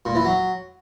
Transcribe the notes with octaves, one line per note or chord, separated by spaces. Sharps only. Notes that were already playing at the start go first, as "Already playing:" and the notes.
A#2
E3
F#3